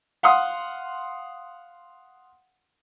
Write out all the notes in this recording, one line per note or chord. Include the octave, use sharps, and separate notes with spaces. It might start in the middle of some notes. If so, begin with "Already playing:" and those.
F5 F#5 C6 D#6